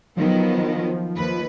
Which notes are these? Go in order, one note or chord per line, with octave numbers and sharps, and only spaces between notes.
D#3 F3 F#3 B3
D#2 B4